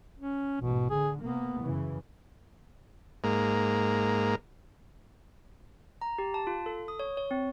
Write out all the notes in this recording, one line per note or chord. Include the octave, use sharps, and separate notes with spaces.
C#4
A1 G#2 B2
D3 G#4
C3 A#3 B3
F#2 C#3 E3
G#2 A#3
A#5
G4
A5
F4
A4
D#6
C#5
C#5
C4